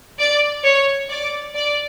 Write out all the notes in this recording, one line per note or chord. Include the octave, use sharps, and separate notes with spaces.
D5
C#5
D5
D5